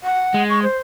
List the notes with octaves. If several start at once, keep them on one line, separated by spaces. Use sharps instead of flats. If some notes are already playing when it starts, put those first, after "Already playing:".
F#5
G#3
C#6
C5